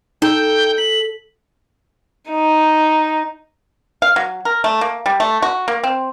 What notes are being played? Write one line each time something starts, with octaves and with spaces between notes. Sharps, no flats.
D#4 A4 G5
B6 F#7
D#4
F5
F#3
A#4
A3
A#3
G3
A3
F#4
A#3
C4